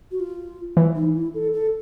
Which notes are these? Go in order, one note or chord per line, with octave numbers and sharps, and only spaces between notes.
F#4
F4
E3
D#4
E4
A4
A4